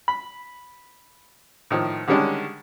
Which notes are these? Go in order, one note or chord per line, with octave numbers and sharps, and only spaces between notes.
B5
A2 D#3 F3
D3 D#3 G3 G#3 C#4 D4